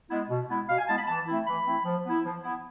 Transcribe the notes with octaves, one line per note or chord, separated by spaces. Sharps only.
G#3 B3 E4
B2
G#3 B3 E4
B2 F5
G#5
G#3 B3 E4 A5
B5
E3 A5
A3 C4 E4
E3 B5
A3 C4 E4
F3
B3 E4
F3
B3 E4